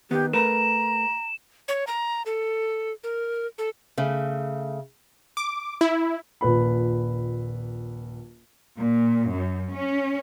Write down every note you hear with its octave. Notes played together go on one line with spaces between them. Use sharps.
D#3 B3 G4
A3 A#4 B4 A#5 E7
C#5
A#5
A4
A#4
A4
C#3 A3
D6
E4
D#1 A#1 B4 B5
A#2
F#2
C#4